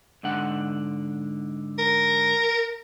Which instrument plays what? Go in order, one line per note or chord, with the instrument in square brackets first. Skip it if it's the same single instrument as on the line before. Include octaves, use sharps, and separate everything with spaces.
[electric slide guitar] G#2 D3 F#5
[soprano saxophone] A#4